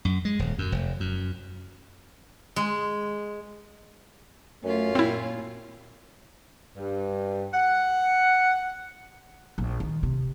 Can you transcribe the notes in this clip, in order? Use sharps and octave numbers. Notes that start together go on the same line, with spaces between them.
F#2
G#3
D#1
F#2
F1
F#2
G#3
F#2 A3 C#4 F4
A#2 C4 E4
G2
F#5
A#1
D#3
C3